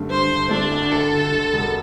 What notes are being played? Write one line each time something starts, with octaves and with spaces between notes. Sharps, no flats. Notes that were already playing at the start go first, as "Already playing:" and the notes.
Already playing: G2 D3 A3
G2 C5
D3
A3 D4
D2
D2 A4
D3
D3
E1